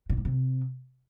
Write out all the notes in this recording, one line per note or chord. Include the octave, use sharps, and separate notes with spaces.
A#2
G#2
C3